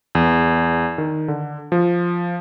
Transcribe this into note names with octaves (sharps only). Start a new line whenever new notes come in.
E2
D#3
D3
F3